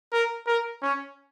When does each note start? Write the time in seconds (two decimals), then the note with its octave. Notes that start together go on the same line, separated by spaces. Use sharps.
0.13 A#4
0.47 A#4
0.82 C#4